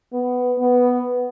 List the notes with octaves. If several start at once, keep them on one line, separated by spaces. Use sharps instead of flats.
B3
B3